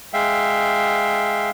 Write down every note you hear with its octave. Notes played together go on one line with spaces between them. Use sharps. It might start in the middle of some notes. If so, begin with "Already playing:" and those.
G#3 E5 F5 G5